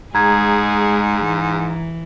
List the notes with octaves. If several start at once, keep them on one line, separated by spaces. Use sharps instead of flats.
G#2 G#3 G#4 A#5 G#6
E3